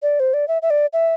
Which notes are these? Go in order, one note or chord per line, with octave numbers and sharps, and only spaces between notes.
D5
C5
D5
E5
E5
D5
E5